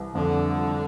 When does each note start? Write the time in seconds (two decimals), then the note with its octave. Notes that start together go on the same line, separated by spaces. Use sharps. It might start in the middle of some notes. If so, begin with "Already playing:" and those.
Already playing: C2 E3
0.15 F2 D3
0.56 F3